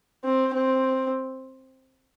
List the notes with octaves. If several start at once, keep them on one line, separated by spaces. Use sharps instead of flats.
C4
C4